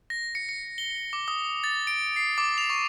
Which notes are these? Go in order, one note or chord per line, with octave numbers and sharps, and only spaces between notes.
A#6
C#7
C#7
G7
D6
D#6
A6
D7
C7
D6
F7
C#6